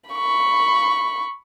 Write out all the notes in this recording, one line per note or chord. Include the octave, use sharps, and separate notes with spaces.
B5 C#6